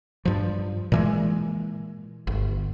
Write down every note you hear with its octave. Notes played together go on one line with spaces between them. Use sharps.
G2 F3
A#2 E3 G#3
G1